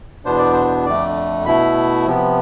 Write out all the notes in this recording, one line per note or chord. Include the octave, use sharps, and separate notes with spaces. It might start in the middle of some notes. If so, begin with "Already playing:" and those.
E2 B2 B3 D4 C5
D5
C5
F2 D3 A3 D5
B2 A3 E4 B5
C3 F3 B3